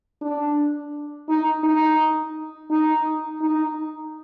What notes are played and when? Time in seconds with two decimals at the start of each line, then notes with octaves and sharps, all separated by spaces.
0.21 D4
1.29 D#4
1.63 D#4
2.70 D#4
3.41 D#4